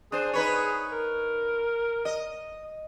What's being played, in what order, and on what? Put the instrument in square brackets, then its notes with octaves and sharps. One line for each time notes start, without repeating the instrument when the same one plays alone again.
[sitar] D4 C5 [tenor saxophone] G#4
[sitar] D#4 B4 C#5
[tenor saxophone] A#4
[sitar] D#5